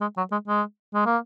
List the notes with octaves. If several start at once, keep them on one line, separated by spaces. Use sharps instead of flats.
G#3
F#3
G#3
G#3
G#3
A#3